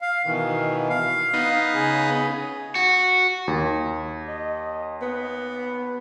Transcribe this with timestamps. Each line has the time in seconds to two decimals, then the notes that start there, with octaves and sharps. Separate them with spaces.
0.01 F5
0.25 B2 D#3 E3
0.89 F5
1.33 B3 D#4
1.74 C#3 G#4
2.75 F#4
3.48 D#2
4.28 D#5
5.02 B3